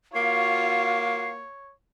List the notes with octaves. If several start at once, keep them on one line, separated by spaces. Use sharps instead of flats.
A#3 F4 F#4 C#5 C7